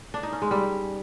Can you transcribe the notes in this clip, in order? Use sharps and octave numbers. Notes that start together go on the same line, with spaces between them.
D4
D#4
C#4
G#3
G3